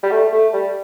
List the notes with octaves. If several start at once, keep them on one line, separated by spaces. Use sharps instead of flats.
G3
A3
A3
G3